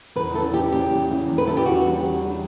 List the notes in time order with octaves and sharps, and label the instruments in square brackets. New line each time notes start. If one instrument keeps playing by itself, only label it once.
[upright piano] E2 [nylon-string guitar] B4
[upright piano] E3 [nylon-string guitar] A4
[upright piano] C#3
[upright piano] E2 [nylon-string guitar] G4
[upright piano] C#3 E3 [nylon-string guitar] G4
[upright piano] E2
C#3 E3
E2
[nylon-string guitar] B4
[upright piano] C#3 E3 [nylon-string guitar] A4
[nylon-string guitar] G4
[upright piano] E2 [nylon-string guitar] F#4
[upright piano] C#3 G3 D4
E2
C#3 G3 D4